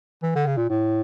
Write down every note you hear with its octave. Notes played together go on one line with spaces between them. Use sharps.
E3
D3
C#3
A#2
A2